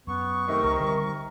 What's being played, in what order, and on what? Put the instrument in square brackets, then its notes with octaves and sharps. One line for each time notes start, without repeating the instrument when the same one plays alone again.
[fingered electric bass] F#2 [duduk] B3 [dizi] C#6
[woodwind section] C3 D#3 [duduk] A3
[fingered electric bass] C#2 A3 C4 [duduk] A#4
[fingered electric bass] D3 G3